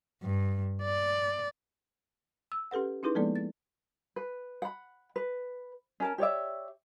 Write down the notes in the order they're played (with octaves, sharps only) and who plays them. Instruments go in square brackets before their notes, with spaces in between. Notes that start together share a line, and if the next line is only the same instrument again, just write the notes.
[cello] G2
D5
[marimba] E6
C#4 G4 A4 B4 F#5
C#4 D#4 E4 G#4 B4 C6
F3 G#3 A#3 B3 A4 D5
A6
[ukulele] B4
F#5 B5
B4
C#4 A#4 A5
G4 C#5 D5 E5